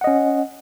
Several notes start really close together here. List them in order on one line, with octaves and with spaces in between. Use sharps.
F#5 D#5 C#4